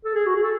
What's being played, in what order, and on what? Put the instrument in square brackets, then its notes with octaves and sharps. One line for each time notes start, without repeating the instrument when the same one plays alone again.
[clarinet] A4
G#4
F#4
G#4
A4